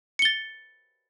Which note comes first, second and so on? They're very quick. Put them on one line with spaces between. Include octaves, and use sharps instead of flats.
C#7 G7 A6